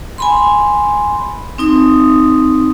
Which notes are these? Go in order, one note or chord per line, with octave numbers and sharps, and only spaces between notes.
G#5 B5 C6
C4 D#4 D#6